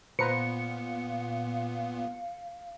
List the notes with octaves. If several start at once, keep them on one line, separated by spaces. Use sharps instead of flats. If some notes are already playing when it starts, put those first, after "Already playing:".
A#2 B3 B4 C5 F5 A#5 C#7